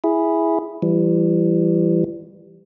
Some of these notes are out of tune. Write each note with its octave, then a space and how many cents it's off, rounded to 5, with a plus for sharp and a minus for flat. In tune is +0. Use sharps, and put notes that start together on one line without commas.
E4 +0 G#4 +0
E3 +30 G3 +5